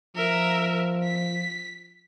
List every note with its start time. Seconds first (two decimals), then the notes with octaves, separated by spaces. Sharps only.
0.15 F3 A#4 E5
1.04 B6